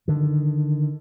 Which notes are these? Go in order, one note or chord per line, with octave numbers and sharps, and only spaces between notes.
D3 D#3